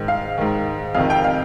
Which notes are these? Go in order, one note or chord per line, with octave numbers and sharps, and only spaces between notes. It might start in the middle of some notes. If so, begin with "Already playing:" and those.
Already playing: G#2 D#3
F5
G#2 D#3
F2 C3 D#3 F5
G5
F5